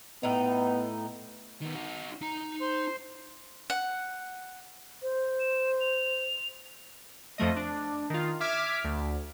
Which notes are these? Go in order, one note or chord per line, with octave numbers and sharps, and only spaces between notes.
A2 B3 D#4
D#3 B3
D#4 F#4
D#4 A#5
C5 C6
F#5
C5
E7
F7
F2 F3 A3 D#5
D4
D#3 F4
E5 D6 F6 G#6 B6 D7
D2